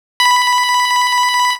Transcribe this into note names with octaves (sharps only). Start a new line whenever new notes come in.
B5